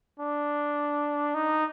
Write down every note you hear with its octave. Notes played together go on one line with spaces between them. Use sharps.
D4
D#4